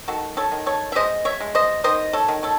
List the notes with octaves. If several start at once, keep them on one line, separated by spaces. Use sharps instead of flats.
D#3 F#4 A4
A4 C#5
D#3
A4 C#5
E5
G#3 C5 D#5
C#5 E5
G#3
C5 D#5
D#3 C5 D#5
A4 C#5
D#3
A4 C#5